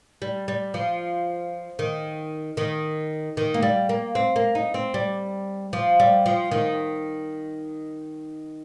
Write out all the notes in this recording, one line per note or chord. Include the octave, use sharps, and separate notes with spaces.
G3
G3
F3
D#3
D#3
D#3
A#3
G3
A#3
C4
A#3
D#4
C4
G3
F3
G3
F3
D#3